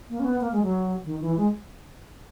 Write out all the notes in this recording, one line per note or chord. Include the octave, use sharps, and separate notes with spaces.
A#3
C#4
B3
A#3
G#3
F#3
D#3
E3
G#3